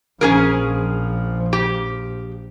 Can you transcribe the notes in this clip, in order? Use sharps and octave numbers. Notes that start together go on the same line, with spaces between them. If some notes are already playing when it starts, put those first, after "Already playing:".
A#1 F3 C#4 G#4 A#4
G4